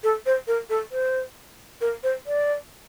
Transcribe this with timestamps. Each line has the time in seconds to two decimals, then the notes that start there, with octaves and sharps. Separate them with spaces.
0.04 A4
0.26 C5
0.48 A#4
0.70 A4
0.92 C5
1.81 A#4
2.04 C5
2.27 D5